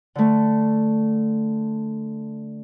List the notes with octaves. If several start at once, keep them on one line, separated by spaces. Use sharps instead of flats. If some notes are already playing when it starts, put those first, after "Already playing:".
D3 A3